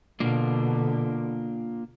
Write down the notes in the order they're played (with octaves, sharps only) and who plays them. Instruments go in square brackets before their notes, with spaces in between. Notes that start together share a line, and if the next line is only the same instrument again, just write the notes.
[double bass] B2 D3 [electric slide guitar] A#3 D4 F4